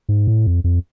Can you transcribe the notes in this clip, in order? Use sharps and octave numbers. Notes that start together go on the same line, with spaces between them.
G#2
A2
F2
F2